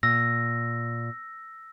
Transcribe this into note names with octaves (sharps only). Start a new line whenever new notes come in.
A#2 E6 A#6